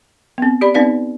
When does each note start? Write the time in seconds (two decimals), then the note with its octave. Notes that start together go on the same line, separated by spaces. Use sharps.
0.38 B3 C4
0.61 G4 D5 B5
0.74 B3 C4 D#4 B4 D5 F5